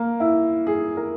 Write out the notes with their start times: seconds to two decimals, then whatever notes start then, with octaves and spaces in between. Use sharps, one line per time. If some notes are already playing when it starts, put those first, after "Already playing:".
Already playing: A#3
0.20 E4
0.67 G#4
0.97 A#4